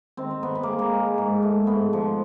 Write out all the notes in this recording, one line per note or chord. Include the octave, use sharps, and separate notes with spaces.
D#3 C4
C4
D#3 B3
B3
G#3 A#3
A#3
G#3
G#2
A3
G#2 B3
F3